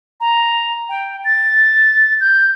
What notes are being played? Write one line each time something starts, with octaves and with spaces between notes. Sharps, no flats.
A#5
G5
A6
G6